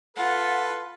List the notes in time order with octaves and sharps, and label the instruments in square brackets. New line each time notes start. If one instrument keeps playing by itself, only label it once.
[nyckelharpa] F4 [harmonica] A4 B4 [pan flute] F#5